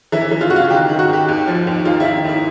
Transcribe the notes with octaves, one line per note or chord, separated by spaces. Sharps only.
E3 E4
E3
F4
C#3 F#4
F4
D#3 G4
D#3
F#4
D#3 G4
D#2
F3
D#2
D#3 F4
E4
D#3
D#2 E4